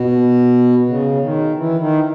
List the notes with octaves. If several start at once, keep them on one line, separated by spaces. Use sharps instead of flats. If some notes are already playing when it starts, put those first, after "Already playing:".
Already playing: B2
C#3
D#3
E3
D#3